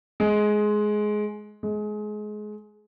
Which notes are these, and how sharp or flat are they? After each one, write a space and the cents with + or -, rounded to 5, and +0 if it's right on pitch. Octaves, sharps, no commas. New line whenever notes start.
G#3 +15
G#3 +25